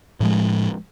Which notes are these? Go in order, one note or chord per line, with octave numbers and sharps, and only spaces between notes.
A2 F3 G#3